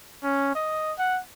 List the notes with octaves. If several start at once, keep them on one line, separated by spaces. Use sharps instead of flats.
C#4
D#5
F#5